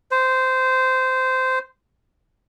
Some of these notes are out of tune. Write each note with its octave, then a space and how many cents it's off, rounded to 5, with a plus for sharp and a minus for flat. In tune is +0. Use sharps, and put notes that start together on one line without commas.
C5 -15